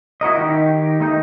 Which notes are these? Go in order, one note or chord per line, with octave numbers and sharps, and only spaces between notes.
E4 F#4 A#4 D#5
D#3 D#4 G4 A#4
A3 D#4 G6